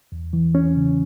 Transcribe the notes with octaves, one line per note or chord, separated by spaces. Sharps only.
E2
E3
E2 C#4
C#3